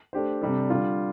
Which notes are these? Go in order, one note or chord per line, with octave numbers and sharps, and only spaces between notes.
A3 D4 G4 C5
C3 G3 D4 A4
D3 G3 F4